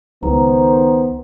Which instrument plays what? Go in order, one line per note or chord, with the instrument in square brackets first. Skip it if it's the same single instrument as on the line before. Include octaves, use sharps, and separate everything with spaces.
[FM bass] C#2 [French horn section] D#3 C5 [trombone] B3 [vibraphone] A#5